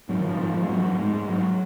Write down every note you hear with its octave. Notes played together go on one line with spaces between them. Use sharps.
G#2 F#3
D#3
G#2 F3
G#2 F3
G#2 F3
G#3
G#2 F#3
G#2
G#2 G#3
G#2
G#2 F#3